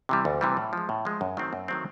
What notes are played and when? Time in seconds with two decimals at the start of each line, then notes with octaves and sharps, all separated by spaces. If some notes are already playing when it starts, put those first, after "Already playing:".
0.09 C3 E3 G3
0.25 D2
0.41 C3 E3 G3
0.57 A2
0.73 F3 G#3
0.89 A2
1.05 F3 G#3
1.21 F#2
1.37 D#3 F#3 A3 C4
1.53 F#2
1.68 D#3 F#3 A3 C4